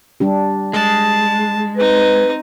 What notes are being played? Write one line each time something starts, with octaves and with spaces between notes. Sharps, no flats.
G3 D4 G4
G#3 A5
C4 D#4 B4